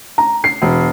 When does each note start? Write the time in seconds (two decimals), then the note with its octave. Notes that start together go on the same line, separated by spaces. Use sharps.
0.18 A#5
0.44 C7
0.62 E1